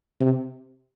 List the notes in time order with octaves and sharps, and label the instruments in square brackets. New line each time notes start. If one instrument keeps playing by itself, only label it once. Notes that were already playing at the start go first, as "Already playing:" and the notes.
[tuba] C3